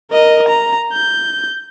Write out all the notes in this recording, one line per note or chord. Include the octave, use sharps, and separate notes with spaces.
A#4 D#5
A#5
G6